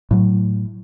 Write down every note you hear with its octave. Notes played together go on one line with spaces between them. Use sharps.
A2 F#3